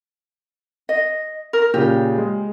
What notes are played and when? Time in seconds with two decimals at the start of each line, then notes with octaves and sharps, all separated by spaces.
0.89 D#5
1.53 A#4
1.74 A#2 C#3 G4
2.18 G#3